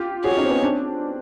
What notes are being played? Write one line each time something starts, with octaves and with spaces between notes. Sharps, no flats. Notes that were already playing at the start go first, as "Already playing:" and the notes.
Already playing: F4 G4
F#4 G#4 C#5
C#4 D#4
C4
B3 C#4
C4 D4